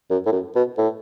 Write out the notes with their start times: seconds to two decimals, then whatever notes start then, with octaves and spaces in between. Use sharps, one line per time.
0.10 F#2
0.26 A2
0.32 F#2
0.55 B2
0.78 A2